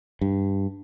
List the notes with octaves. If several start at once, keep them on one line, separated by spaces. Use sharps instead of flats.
G2